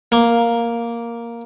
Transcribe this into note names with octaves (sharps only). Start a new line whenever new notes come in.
A#3